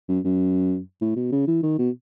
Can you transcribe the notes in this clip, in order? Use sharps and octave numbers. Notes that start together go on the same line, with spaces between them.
F#2
F#2
A2
B2
C#3
E3
D#3
B2